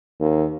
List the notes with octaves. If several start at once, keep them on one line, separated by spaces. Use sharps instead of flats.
D#2